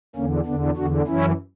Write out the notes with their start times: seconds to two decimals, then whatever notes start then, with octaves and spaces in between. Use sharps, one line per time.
0.16 E2 D3 A#3 C#4
0.46 E2 D3 B3 D4
0.76 E2 D3 D4 F#4
1.07 F#2 E3 C#4 E4